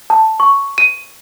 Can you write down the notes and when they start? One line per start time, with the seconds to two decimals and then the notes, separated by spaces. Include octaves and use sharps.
0.10 A5
0.40 C#6
0.78 D#7